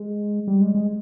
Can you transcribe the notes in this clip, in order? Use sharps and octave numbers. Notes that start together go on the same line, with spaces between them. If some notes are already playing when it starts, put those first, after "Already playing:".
Already playing: G#3
G3
G#3
G#3